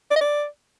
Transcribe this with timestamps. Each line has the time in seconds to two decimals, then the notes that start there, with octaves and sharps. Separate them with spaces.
0.11 D5
0.16 D#5
0.21 D5